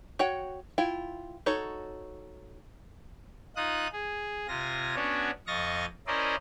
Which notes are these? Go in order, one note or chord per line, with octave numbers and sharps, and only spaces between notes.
F#4 C#5 F#5 G5
E4 F4 G5
D#4 F#4 A4 C#5
D#4 F4 D#6 F#6
G#4
C3 F4 G#5 A#6
B3 C#4 D4 F#4 C#5
F2 D#5 F5 C#6 A6 A#6
C#4 E4 A#4 C5 D5 D#5